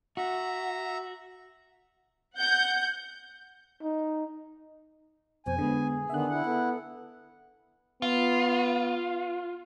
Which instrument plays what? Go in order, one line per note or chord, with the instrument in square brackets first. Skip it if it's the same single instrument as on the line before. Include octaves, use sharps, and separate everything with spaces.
[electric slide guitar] F#4 [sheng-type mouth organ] E5 A#5
[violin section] F#5 G6
[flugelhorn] D#4
[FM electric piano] F2 B2 [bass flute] C5 [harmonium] G#5
[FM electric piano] D3 G#3 [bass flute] B3 [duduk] G#4
[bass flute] D3 [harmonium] D#3 B3 [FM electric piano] E5 F#6
[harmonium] E4 F#5
[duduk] B3 [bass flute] A4
[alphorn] B3 [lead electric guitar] F4